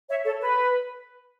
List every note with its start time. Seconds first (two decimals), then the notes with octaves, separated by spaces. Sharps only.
0.09 C#5 E5
0.24 A4 C#5
0.40 B4